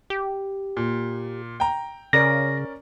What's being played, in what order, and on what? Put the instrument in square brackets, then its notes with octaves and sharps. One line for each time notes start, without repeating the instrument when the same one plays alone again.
[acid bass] G4
[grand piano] A#2
G5 A#5
[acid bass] C#3 [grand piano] C#4 A#4 D5 [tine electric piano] A#6